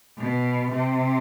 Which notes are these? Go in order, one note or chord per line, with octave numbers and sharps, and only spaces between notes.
B2
C3